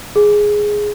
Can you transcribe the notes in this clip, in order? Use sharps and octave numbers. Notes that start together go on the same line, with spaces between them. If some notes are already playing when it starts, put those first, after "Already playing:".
G#4